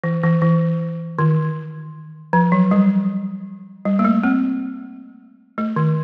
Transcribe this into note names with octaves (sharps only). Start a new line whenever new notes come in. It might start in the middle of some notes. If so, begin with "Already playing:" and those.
E3
E3
E3
D#3
F3
F#3
G3
G3
A#3
A3
C4
A3
D#3